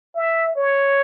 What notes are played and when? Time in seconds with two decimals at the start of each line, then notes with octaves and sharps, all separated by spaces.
0.15 E5
0.56 C#5